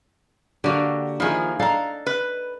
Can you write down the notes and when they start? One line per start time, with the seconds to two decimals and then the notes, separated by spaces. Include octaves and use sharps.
0.64 D3 A#3 F#4 G4 F5
1.20 D#3 F3 E4 G#4
1.59 D4 D#4 A4 F5 A#5
2.06 B4